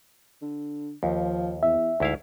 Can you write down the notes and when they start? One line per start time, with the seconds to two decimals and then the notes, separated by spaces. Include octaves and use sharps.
0.42 D3
1.03 D#2 F3
1.63 E2 E5
2.00 D2 G#2 E4 F5